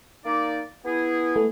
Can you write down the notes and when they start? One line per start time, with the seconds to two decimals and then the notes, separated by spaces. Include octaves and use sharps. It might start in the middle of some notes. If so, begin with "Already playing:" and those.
0.25 A#3 D#4 D5
0.85 B3 E4 G#4
1.36 A3